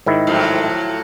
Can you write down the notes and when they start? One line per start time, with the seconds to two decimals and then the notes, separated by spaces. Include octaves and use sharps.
0.06 G#2 D#3 E4
0.27 A2 F3 F#3